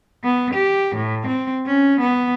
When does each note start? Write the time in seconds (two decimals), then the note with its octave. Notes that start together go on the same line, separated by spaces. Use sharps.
0.24 B3
0.54 G4
0.96 A2
1.27 C4
1.66 C#4
2.01 B3